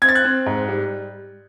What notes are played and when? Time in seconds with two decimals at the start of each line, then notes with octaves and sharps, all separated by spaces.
0.02 C4 G#6
0.09 A6
0.15 F#6 G#6
0.24 C4
0.46 G#2
0.68 G3